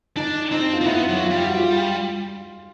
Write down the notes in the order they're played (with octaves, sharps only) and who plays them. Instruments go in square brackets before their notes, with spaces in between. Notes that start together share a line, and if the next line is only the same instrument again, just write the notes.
[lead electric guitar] D4 [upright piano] D#4
[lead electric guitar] C4 [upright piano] D#4
[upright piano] F4
[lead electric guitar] A#3
[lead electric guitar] B3 [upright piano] E4
[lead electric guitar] F#3
[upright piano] F4
[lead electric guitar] G3
[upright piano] F#4
F4